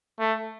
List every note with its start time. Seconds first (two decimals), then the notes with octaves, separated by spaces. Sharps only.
0.19 A3